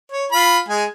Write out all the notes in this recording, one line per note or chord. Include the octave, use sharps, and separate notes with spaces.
C#5
F4 B5
G#3 G#5